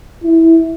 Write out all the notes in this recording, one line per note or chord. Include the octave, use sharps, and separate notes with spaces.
E4